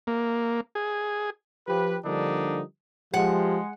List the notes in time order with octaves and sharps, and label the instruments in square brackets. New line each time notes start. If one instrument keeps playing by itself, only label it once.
[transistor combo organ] A#3
G#4
[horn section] F3 G4 B4
D3 F3 G3 A#3 D4 D#4
[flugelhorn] F3 [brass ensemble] G#3 [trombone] G4 [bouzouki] F#5